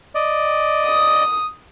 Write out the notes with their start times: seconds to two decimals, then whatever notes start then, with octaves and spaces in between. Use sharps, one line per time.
0.15 D5 D#5
0.87 D#6